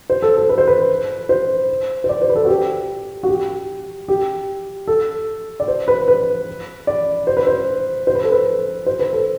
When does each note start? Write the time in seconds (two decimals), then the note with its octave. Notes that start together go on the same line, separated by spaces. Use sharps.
0.10 C5
0.22 A4
0.37 A4
0.49 B4
0.58 C5
0.68 B4
1.29 C5
2.04 C5
2.09 D5
2.22 C5
2.29 B4
2.35 A4
2.45 F#4
2.49 G4
3.23 F#4
3.29 G4
4.08 G4
4.87 A4
5.60 D5
5.68 C5
5.88 B4
6.08 B4
6.87 D5
7.27 C5
7.37 B4
7.47 C5
8.07 C5
8.15 B4
8.24 A4
8.32 B4
8.86 C5
8.99 B4
9.13 A4